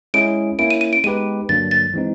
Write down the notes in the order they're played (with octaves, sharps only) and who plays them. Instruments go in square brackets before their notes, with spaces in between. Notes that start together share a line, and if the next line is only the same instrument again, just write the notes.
[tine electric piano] G#3 C#4 E4 G#4 [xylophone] D7
[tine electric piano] A#3 C#4 E4 [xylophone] D7
[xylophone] D#7
D#7
D7
[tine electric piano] G#3 B3 D#4 G4 B4 [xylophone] D#7
[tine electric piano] G2 D3 F#3 A#3 D4 [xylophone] A6
[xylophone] A6
[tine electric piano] E3 G#3 C4 D#4